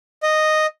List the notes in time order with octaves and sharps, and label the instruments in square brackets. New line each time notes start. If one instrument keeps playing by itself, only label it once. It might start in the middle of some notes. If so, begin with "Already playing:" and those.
[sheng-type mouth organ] D#5